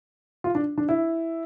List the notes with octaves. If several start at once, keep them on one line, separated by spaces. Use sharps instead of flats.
F4
D4
D4
E4